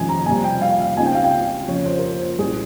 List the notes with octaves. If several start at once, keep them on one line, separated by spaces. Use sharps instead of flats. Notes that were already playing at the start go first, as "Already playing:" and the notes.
Already playing: F2 C3 D#3 G#3 C#4 G#5
A#5
F2 C3 G3 G#5
G5
F5
F5
C#2 C#3 G#3 C4 D#4 G#5
G5
F5
G5
F2 C#3 F3 C#5
C5
A#4
C5
C2 A#2 G3 C#4 G#4